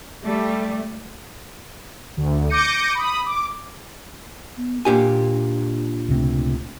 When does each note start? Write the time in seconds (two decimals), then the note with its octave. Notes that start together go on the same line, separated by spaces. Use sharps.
0.24 G3 A3
2.17 D2
2.49 D6 G6 A#6 C#7 D#7
2.95 B5 D#6
3.26 D6
4.57 B3
4.85 A#2 D4 G4 G#5
6.08 C#2 C3 A3